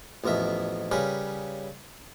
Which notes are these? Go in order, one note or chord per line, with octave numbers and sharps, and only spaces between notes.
A1 F2 B2 A#4 E5
C#3 G3 C#4 A#4 B4